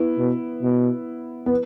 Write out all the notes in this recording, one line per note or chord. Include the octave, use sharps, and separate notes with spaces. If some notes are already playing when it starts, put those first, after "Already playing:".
Already playing: B3 E4
B2
B2
B3